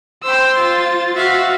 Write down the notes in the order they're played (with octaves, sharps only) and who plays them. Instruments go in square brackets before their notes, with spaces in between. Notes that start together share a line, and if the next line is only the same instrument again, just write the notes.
[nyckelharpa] C5 C6 [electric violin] G5 E6
[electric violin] F4 A6
[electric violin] F#4 [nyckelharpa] E5 F5